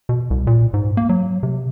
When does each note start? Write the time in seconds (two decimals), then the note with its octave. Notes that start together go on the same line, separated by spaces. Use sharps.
0.09 B2
0.30 C2
0.47 A#2
0.74 G#2
0.97 A#3
1.09 F#3
1.43 C3